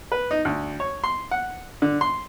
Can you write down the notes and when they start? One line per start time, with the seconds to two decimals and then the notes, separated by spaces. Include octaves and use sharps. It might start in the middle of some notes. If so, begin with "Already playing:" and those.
0.12 B4
0.31 D#4
0.45 D2
0.80 C#5
1.04 C6
1.31 F#5
1.82 D3
2.01 C6